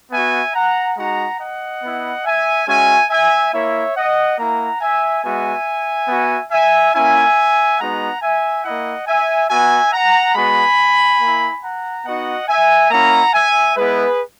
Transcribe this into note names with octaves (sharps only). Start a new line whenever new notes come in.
B3 F#4 E5 G#5
F#5 A#5
G#3 D#4 F#4 F#5 A#5
D#5 F#5
B3 E4
E5 G#5
G#3 C#4 F#4 E5 G#5
E5 G#5
A#3 E4 C#5 E5
D#5 F#5
A#3 E4 F#5 A#5
E5 G#5
G#3 B3 F#4 E5 G#5
B3 F#4
E5 G#5
A#3 C#4 E4 E5 G#5
G#3 B3 D#4 F#4 F#5 A#5
E5 G#5
A#3 E4 D#5 F#5
E5 G#5
B3 F#4 E5 G#5
F#5 A#5
G#3 B3 F#4 G#5 B5
A#3 E4
F#5 A#5
B3 D#4 F#4 D#5 F#5
E5 G#5
A#3 C#4 E4 F#5 A#5
E5 G#5
G#3 B3 E4 G#4 B4